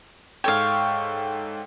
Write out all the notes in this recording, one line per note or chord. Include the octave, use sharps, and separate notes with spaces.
G#2 A4 C#5 F5 G5